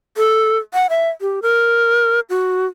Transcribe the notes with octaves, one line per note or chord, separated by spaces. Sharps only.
A4
F#5
E5
G4
A#4
F#4